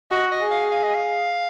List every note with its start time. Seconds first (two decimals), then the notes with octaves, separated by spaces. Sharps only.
0.11 F#4 D#5
0.32 D#5
0.41 G#4
0.51 F5
0.71 F5
0.83 D#5
0.94 F5